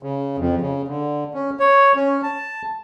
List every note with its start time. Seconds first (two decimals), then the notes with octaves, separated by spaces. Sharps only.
0.03 C#3
0.38 F2
0.61 C#3
0.88 D3
1.34 C#4
1.59 C#5
1.96 C#4
2.23 A5